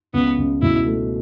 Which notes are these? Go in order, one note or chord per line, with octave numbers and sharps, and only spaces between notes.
C#2 B3
C#2
B2 E4
A3